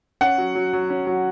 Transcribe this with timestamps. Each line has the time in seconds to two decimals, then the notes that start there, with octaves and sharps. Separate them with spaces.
0.21 C#4 F#5
0.38 F#3
0.55 F#3
0.73 F#3
0.90 C#4
1.07 F#3